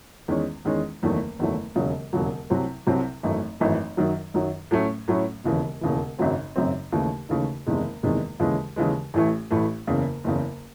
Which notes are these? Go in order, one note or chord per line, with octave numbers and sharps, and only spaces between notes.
E2 D#3 G#3 C#4
E2 D#3 G#3 C#4
F#1 E2 D#3 F#3 A3
F#1 E2 D#3 F#3 A3
E1 D#2 C#3 F#3
E1 D#2 C#3 F#3
C2 C3 F#3 C4
C2 C3 F#3 C4
G#1 F#2 E3 A3
G#1 F#2 E3 A3
F#2 D#3 F#3
F#2 D#3 F#3
A2 F#3 A3 C#4
A2 F#3 A3 C#4
E1 D#2 C#3 E3
E1 D#2 C#3 E3
G#1 F#2 C#3 F#3 C4
G#1 F#2 C#3 F#3 C4
D#2 C#3 E3 A3 D#4
D#2 C#3 E3 A3 D#4
F#1 E2 C3 D#3 G#3
F#1 E2 C3 D#3 G#3
D#2 C#3 E3 G#3
D#2 C#3 E3 G#3
A1 A2 E3 A3
A1 A2 E3 A3
F#1 E2 C#3
F#1 E2 C#3